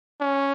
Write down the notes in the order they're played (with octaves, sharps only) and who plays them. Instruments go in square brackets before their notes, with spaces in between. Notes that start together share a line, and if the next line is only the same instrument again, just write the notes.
[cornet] C#4